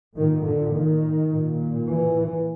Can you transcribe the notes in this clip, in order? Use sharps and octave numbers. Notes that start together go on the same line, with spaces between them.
A#2 D#3
D3
D#3
A#2
E3